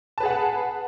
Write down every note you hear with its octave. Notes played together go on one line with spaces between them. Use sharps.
G#4 B4 F#5 A5